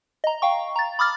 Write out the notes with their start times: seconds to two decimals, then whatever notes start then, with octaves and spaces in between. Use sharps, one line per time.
0.24 D#5 A#5
0.42 F5 G5 C#6
0.76 A#5 A6
0.99 B5 D6 D#6 F6 A6